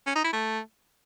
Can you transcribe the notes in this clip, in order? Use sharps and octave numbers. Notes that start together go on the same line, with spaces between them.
C#4
D#4
E4
A3